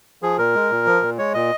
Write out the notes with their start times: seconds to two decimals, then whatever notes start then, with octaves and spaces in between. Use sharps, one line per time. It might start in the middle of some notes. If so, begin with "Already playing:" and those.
0.22 F3 G#4
0.38 A#2 A#4
0.55 G#3
0.71 A#2
0.86 F3
1.02 A#2
1.18 G#3 C#5
1.34 A#2 D#5